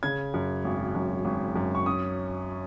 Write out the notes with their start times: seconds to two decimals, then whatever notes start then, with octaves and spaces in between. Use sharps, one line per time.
0.03 C#3 G#6
0.34 F#2
0.64 G#1
0.95 F#2
1.25 G#1
1.56 F#2
1.75 C#6
1.86 C#4 D#6